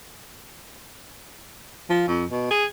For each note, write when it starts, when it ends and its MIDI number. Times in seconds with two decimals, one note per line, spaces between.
1.90 2.04 53
2.08 2.25 41
2.31 2.48 47
2.51 2.65 68